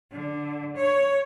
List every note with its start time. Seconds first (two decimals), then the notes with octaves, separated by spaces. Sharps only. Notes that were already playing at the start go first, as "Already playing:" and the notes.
0.11 D3
0.75 C#5